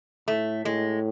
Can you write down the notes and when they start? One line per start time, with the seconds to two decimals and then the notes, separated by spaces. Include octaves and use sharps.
0.28 A2 A3
0.65 A2 G#3